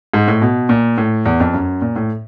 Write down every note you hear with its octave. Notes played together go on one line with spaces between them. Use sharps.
G#2
A2
B2
A#2
A2
E2
F2
F#2
A#2
A2